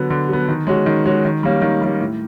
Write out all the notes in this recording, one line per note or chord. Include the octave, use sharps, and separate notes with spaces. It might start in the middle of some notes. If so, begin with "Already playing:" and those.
Already playing: D3 F#3 B3
D3
F#3 B3
D#3
G#3 C#4 F#4
D#3
G#3 C#4 F#4
D#3
G3 A#3 C#4
D#3
G3 A#3 C#4
A2